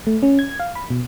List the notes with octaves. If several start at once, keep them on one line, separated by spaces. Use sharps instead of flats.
A3
C#4
G#6
F5
B5
B2